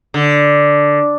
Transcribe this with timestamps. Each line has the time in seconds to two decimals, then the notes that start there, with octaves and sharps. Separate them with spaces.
0.14 D3